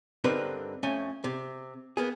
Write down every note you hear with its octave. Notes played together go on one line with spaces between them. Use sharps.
G2 D3 C4 D#4 A#4 B4
F2 A3 C#4 G#5
C3
A#3 B3 G#4